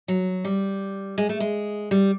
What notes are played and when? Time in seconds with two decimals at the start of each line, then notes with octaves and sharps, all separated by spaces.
0.08 F#3
0.44 G3
1.18 G#3
1.29 A3
1.40 G#3
1.91 G3